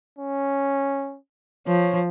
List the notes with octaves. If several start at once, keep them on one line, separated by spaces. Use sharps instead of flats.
C#4
F3 C#5